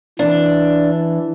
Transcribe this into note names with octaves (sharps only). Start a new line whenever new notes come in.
E3 D4